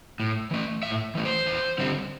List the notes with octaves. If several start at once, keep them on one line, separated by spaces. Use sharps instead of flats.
A2
E3 A3
A2 E5
E3 A3
C5
E2
D3 G3 C4